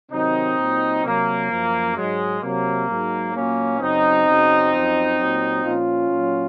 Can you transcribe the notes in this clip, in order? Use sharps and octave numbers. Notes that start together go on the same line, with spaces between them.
C3 D#3 F#3 C4 D#4
A#2 F#3
C3 F#3 A#3
F#2 F3
G#2 F#3 G#3
C3 F#3 A#3
G#2 F#3
A#2 F#3 A#3 C#4
F#2 C#3 F#3 C4 D#4
F#2 C#3 F#3
F#2 F3
A#2 F#3
A#2 F3 C#4 F4
A#2
F#3